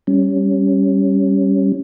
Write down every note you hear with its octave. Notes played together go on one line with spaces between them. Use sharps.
G3 C#4